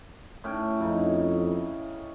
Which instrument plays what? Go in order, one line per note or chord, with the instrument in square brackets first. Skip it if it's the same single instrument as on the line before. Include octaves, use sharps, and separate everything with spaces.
[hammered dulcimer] A2 C#4 G5
[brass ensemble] F2 [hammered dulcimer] C#3 D#4